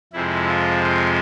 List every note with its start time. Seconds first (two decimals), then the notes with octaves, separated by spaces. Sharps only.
0.13 F2 C3 F3 G#3 E4
0.48 F4
0.83 F4